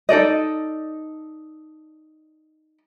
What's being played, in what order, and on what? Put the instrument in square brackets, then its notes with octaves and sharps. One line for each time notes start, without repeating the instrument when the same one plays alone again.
[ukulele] D#4 A4 D5 D#5